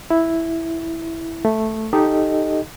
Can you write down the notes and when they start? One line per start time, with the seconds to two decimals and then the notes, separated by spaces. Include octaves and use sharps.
0.10 E4
1.45 A3
1.93 D#4 G4 A4 D#5